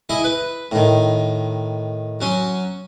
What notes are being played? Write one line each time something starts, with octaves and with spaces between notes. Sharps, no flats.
E4 G#4 D#5
B4
A2 D#3
F#3 C#4 C6